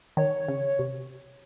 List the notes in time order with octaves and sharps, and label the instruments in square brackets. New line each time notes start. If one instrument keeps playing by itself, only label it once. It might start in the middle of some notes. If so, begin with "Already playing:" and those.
[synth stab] D#3 [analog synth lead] C#5
[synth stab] C#3
C3